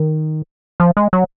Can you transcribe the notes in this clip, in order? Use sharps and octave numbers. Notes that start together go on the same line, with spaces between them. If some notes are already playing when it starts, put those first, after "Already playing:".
Already playing: D#3
F3
G#3
F#3